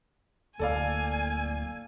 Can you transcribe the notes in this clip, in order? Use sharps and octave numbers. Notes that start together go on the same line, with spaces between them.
D1 A#3 A4 D5 F5 G#5